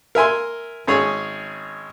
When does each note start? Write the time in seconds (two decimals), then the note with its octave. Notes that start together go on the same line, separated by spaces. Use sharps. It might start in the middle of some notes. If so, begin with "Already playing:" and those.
0.15 A#4 E5 G#5 C6
0.88 G#1 C#4 G#4 C#5